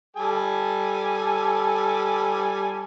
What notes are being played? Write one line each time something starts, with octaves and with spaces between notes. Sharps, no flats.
G3 A4 G#5